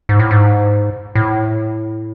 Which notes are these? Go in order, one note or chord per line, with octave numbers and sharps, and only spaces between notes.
G#2
A2
G#2
A2